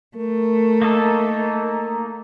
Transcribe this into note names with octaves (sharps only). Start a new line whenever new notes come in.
A3 A#4
A#3 D#4 A4